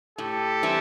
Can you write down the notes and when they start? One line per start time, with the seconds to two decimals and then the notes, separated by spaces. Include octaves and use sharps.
0.18 A2 G4 A4
0.63 E3 G3 C4